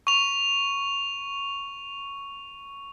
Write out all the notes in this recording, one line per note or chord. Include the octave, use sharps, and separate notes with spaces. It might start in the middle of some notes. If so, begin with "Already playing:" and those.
C#6 F7